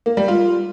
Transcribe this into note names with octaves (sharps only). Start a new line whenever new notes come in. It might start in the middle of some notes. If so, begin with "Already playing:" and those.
A#3
G3
F4